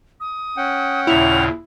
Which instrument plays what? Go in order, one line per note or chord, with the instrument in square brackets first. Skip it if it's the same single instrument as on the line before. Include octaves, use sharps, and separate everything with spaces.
[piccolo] D#6
[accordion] C#4 F#5 G5
[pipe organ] D#2 A#2 C#3 [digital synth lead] E4 [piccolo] F7